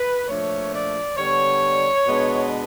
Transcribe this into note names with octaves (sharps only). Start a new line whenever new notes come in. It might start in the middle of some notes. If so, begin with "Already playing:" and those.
Already playing: B4
A#2 F3 A3 D4 C#5
D5
D3 G3 B3 D4 C#5
B2 G#3 B3 D4